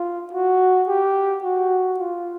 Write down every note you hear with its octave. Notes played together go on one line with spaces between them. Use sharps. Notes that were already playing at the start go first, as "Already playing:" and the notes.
Already playing: F4
F#4
G4
F#4
F4